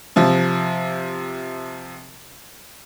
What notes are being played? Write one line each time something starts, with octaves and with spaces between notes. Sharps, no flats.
C3 F3